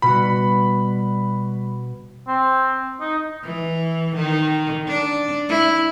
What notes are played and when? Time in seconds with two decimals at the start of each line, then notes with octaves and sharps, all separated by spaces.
0.02 B2 G3 F#4 B5
2.28 C4
3.01 D#4
3.44 E3
4.15 D#3
4.87 D4
5.49 E4